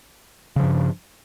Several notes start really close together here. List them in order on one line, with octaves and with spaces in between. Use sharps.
C#3 F3 G2